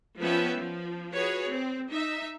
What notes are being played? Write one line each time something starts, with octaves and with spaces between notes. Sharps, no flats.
F3 B3 C#4 B4 E5 G5
F3
F#4 G#4 B4 C#5
C4
D#4 E5